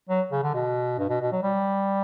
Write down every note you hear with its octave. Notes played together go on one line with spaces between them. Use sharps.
F#3
C#3
D3
B2
G2
B2
B2
F#3
G3